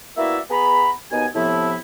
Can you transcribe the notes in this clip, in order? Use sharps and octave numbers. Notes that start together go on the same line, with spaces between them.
A#3 B3 E4 F#4 D5 E5
B3 G#4 F#5 A#5 B5
D#2 B2 B3 D#4 G#5
A2 C3 F3 B3 E4